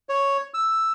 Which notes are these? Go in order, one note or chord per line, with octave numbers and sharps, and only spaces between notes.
C#5
E6